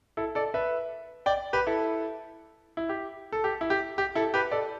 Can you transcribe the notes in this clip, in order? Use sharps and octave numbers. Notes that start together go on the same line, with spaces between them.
E4 A4
A4 D5
B4 E5
D5 G5
G4 B4
E4 A4
E4
G4
A4
G4
E4
G4
G4
E4 A4
G4 B4
A4 D5